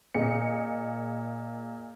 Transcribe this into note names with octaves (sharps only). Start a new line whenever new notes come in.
A#2 G#4 D#5 C#7